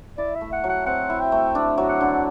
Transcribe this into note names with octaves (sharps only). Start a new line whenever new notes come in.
E4 D5
E5
A3
F#5
F#3
F#5
C4 F#5
E4
G5
A3
D4
F#3
F#5
D3